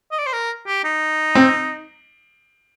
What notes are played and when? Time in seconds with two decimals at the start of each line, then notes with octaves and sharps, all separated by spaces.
0.11 D#5
0.19 D5
0.26 C5
0.33 A#4
0.67 G4
0.84 D#4
1.35 C4